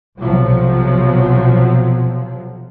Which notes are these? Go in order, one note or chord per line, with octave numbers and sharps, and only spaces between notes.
B1 C3 F3 F#3